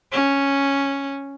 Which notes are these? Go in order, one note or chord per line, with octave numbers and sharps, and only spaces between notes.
C#4